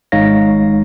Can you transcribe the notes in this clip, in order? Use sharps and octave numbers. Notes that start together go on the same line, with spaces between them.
G#1 G#3 D#4 C#5 F5 A#6